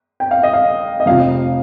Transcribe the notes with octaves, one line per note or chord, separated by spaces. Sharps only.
G5
F5
D#5
F5
D#5
F1 F2 C3 F3 F5